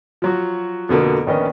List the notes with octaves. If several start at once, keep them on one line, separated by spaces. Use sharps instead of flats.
F3 F#3 F#4
F2 B2 D3 A#3
A#1 D#3 B3 C#4 A#4 D#5